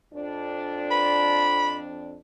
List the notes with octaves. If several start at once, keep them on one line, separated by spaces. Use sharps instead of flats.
F2 D4
B5